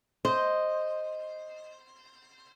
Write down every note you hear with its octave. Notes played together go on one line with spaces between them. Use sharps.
C5 D#5